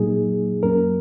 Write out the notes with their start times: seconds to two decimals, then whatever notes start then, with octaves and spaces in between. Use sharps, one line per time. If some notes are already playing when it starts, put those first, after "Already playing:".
Already playing: A#2 F#3 A#3 D#4 G#4
0.63 F#2 F#3 A#3 C#4 A#4